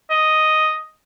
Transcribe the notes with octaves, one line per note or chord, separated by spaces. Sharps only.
D#5